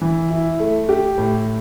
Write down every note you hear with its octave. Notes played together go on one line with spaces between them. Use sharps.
E3
E4
A3
G4
A2